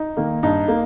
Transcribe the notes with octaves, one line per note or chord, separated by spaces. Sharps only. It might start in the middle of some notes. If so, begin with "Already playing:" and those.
Already playing: D#4
D#3 A#3
G2 D#4
A#3